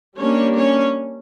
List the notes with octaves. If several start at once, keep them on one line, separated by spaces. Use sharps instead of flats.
G3 A#3 C#4 D4 C#5
C#4 C#5